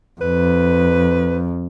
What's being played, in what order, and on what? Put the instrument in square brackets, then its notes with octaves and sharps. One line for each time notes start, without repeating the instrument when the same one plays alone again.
[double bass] F2 [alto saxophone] B4